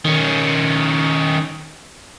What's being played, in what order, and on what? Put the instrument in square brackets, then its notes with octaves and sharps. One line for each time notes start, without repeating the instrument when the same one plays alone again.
[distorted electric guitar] D#3 C#4